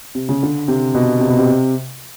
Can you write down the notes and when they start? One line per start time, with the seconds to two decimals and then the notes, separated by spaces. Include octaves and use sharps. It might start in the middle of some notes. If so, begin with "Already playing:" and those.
0.15 C3
0.29 C#3
0.43 D3
0.68 C3
0.94 B2
1.20 C3
1.29 B2
1.39 C3